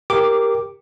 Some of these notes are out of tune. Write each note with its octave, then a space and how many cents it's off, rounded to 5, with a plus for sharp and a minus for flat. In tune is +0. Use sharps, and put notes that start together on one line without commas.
G4 +10 A#4 +0 D6 -5